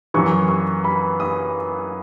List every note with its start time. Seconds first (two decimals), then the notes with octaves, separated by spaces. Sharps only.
0.14 F#2 E3 C#6
0.49 C#6
0.84 B5
1.20 D#6